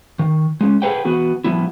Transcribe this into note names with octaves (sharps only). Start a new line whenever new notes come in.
D#3
G#3 C#4
G#4 A4 B4 C5 F#5 G5
E3 B3 F#4
F3 G3 B3 E4